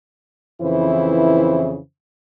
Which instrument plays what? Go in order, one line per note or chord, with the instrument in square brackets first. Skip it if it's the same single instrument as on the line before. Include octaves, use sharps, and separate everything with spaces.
[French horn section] F2 C#3 E3 E4 B4 C5